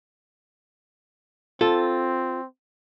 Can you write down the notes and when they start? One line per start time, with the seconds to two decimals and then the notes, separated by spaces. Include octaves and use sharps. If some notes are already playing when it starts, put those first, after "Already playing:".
1.61 C4 F4 A4